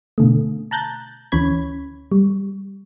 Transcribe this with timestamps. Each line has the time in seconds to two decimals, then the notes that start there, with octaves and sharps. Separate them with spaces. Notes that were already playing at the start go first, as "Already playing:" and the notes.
0.18 B2 D3 A3
0.71 A5 A#5 F#6 G6 A6
1.32 D2 E3 C#4 C#5 B5 G#6
2.12 G3